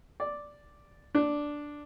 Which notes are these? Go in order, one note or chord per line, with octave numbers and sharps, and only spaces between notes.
D5
D4